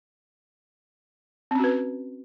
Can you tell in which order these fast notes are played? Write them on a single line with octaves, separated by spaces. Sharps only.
C4 C#4 F#4 B4